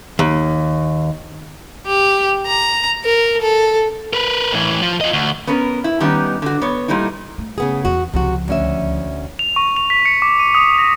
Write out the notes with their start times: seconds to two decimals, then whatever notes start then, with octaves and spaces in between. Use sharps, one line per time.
0.19 D#2
1.86 G4
2.46 A#5
3.04 A#4
3.42 A4
4.13 A#4 B4
4.52 A2 E3
4.82 F3
5.01 F4 D#5
5.13 D2
5.47 B3 C#4 A#4
5.84 E4
6.00 D#3 G3 B3 C#4 D#4
6.42 D3 F#4
6.62 B3 C#5
6.88 A#2 G3 A3 D#4 E4
7.38 A3
7.58 C#3 B3 G#4
7.85 E2 B3 F#4
8.14 C#2 C3 F3 F#4
8.48 D2 C#4 E5
9.39 F7
9.56 C#6
9.76 F7
9.90 B6
10.05 C#7
10.22 D6
10.39 D#7
10.55 D#6
10.78 A#6